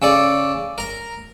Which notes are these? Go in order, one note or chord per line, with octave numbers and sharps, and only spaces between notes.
C#3 A4 D5
A#4 A#5